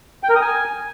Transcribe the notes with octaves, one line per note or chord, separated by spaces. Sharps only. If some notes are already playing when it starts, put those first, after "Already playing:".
G5
A#4
D#6
G#5